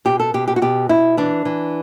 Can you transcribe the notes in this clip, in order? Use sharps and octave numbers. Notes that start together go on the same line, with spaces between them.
B2 G4
A4
B2 G4
G4
F#4
B2 G4
B2 E4
E3 D4
E3